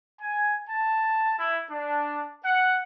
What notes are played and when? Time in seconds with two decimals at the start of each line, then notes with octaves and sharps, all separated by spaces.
0.21 G#5
0.68 A5
1.39 E4
1.71 D4
2.45 F#5